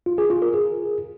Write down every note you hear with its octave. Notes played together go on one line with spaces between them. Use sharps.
F4
G#4
F4
A#4
G#4